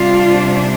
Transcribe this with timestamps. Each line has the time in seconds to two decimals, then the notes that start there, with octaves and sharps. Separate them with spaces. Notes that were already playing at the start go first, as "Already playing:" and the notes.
Already playing: C3 G3 D4 F4